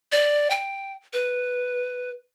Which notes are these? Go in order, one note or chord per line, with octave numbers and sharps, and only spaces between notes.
D5
G5
B4